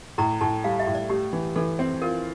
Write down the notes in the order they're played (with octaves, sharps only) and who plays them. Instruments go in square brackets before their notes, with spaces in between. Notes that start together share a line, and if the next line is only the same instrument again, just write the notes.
[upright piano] A2 [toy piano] A#5
[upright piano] A2 [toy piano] A5
[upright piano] G3 [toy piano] F5
[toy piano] E5
[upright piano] A2
[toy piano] D5
[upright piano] A3 [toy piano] G4
[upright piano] E3
[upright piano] E3 [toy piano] A4
[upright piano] C4
[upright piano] F4 [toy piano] A#4